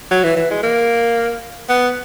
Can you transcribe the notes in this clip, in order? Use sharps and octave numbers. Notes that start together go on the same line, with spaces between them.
F#3
E3
E3
G#3
A#3
B3